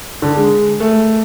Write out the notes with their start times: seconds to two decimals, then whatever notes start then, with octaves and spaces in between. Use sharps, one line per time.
0.22 D3
0.35 G#3
0.80 A3